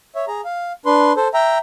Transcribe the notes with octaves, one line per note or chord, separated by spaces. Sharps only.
C#5 E5
G#4 A#5
F5
D4 B4 C6
A4 C5
E5 G5 A#5